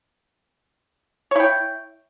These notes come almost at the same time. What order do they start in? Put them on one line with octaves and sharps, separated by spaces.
C#5 E4 G5